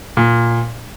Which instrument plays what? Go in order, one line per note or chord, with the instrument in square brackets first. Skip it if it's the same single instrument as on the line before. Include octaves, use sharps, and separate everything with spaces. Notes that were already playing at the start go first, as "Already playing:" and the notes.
[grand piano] A#2